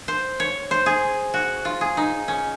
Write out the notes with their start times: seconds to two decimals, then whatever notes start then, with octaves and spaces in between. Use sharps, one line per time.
0.08 C5
0.40 C#5
0.71 C5
0.86 G#4
1.34 F#4
1.65 F4
1.81 G#4
1.97 D#4
2.28 C#4